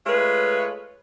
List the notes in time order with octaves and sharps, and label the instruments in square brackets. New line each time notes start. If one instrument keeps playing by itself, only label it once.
[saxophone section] G#3 A3 F4 B4 C#5